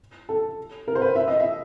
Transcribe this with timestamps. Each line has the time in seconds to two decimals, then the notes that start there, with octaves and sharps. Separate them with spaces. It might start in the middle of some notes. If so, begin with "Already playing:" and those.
0.29 A4
0.88 A#4
0.95 C5
1.02 B4
1.16 E5
1.28 D#5
1.40 E5